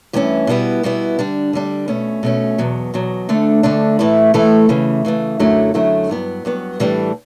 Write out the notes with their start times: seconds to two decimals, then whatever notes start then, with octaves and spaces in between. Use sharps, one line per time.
0.13 G2 E3 A3 C#4
0.47 B2 G3 B3 E4
0.83 B2 G3 B3 E4
1.19 D3 G3 D4
1.53 D3 G3 D4
1.88 B2 A3 C#4
2.23 B2 A3 C#4
2.58 E2 B2 F#3
2.94 E2 B2 F#3
3.29 D2 D3 A3 D4
3.63 D2 D3 A3 D4
3.99 A2 E3 A3 E4 A4
4.34 A2 E3 A3 E4 A4
4.69 C#3 E3 A3
5.05 C#3 E3 A3
5.39 F#2 D3 F#3 A3 E4
5.74 F#2 D3 F#3 A3 E4
6.10 G2 F#3 B3
6.45 G2 F#3 B3
6.80 A2 E3 G3 D4 A4